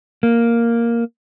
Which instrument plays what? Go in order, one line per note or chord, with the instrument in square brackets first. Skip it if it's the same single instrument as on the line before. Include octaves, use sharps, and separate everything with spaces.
[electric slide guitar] A#3